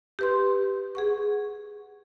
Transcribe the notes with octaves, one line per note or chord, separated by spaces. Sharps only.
G4 B4 C6
G#4 F#5 C#6